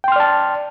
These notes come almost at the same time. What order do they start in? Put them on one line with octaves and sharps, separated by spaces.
G5 C6 F6 D5 A5